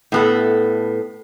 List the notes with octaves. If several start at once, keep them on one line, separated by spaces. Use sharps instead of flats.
A2 B3 A4